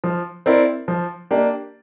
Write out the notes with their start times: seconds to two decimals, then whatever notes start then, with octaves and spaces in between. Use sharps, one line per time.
0.04 F3
0.46 C4 E4 A#4 D5
0.88 F3
1.31 A#3 D4 G4